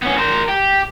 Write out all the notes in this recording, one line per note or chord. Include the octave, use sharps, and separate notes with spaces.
B3 C#4
A#4 C5
G4